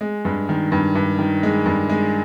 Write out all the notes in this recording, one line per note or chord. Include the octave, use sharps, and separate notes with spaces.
G#3
G2
D#3
G2
G2
D#3
G#3
G2
G#3